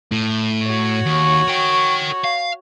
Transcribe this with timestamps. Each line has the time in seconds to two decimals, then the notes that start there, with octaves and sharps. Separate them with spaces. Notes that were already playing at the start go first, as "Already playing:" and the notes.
0.12 A2
0.66 F#4 C#5
1.05 D#2
1.48 A#4 G5
2.24 F5